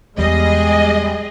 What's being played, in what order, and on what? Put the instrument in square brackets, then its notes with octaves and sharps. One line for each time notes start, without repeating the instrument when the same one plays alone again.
[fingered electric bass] E2 [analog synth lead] G3 [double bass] G#3 [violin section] G#4 D#5